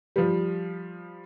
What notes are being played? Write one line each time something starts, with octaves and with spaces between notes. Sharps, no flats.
F3 G3